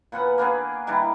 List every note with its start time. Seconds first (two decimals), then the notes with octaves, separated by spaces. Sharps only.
0.12 A#2 B3 F#5 G#5
0.38 A#3 B3 D4 G#4
0.87 D#3 G3 D4 E4